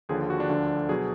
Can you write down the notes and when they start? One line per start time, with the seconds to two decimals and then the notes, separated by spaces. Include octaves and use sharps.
0.09 D#2 D3 F3 G#4
0.30 F#4
0.40 D4
0.49 D2 D3 F3
0.89 B2 F#3 G#4